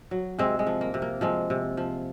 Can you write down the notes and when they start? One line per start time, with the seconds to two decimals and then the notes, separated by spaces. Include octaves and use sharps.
0.11 F#3
0.39 C3 G#3 C4
0.59 G#3
0.67 F3
0.81 A#3
0.94 C3
1.02 A#3
1.21 F3 G#3 C4
1.50 C3
1.77 F3